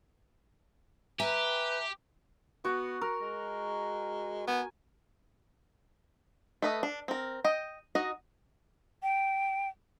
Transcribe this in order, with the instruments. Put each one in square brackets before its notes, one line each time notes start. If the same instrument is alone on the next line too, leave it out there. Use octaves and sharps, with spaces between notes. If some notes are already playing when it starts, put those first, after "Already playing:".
[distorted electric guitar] G4 [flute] B4 [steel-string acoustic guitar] E5 G#5 A#5
[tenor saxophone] B3 [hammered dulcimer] F#4
[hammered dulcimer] A#4
[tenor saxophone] G#3
[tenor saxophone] B3 [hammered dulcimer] G#5
[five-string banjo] A3 B4 D#5
D4
C4 A#4
D#5 G5
D#4 F#4 D#5
[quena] G5